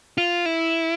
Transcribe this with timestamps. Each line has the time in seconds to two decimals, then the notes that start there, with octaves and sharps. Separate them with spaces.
0.18 F4
0.46 E4